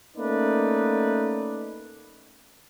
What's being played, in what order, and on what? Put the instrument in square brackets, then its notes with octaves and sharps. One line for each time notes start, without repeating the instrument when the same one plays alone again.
[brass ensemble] A3 A#3 C#4 D#4 B4 D5